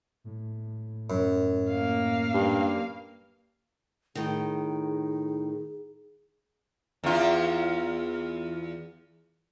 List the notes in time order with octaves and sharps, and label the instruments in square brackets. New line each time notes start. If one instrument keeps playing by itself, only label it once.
[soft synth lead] A2
[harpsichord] F#2
[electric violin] A#3 F5
[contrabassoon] G2
[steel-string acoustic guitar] A2 D#3 [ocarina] G#4
[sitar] E2 F4